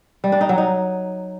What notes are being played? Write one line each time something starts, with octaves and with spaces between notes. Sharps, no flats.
G3
D4
D#4
F#3
D#4